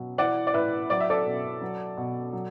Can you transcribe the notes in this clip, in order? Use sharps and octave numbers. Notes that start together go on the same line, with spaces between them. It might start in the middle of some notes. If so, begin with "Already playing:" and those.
Already playing: B2 F#3
E3 D5 F#5
D5
A2 B4 E5
F#3 D5
E5
A4 D5
B2
F#3
B2
F#3